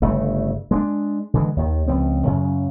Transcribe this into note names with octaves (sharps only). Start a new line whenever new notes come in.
G1 C#3 A3
G#3 A#3 D4
D3 E3 G#3
D#2 D#3
C#2 F3 C4
F#2 C#3 F#3